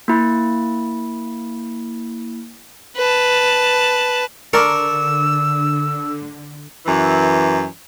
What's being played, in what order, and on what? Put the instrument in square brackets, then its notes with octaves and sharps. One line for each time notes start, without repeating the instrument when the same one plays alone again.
[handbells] A#3 E4
[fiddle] B4 A5
[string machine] D3 [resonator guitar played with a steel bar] A#4 [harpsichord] D5 A5 C#6 [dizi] E6
[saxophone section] F#2 E3